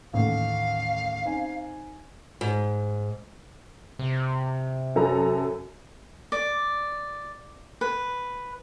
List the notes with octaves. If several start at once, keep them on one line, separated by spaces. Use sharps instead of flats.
A1 D#2 A3 F5
C4 D#4 G#5
G#2
C3
F#2 A4 A#5
D5
B4